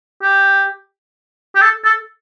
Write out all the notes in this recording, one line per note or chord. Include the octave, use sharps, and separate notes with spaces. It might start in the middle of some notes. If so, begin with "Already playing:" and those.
G4
G4
A4
A4